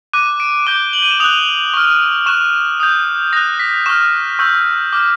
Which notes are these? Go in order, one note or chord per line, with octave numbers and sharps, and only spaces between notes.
D6 F#6 D#7
D7
D6 G6 G7
F#7
D#7
E7
D#6 F#6 F7
C#6 F6
C#6 F#6 E7
D#6 G6
D#6 F#6 A#6
B6
C#6 F6 E7
C#6 E6 G6
D6 F6